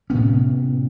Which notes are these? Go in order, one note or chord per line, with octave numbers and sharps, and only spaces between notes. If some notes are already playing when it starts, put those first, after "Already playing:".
A2 C3 B3 C#4